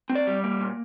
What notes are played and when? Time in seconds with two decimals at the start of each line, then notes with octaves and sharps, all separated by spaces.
0.10 C4
0.15 D5
0.27 G3
0.44 A#3
0.61 A#2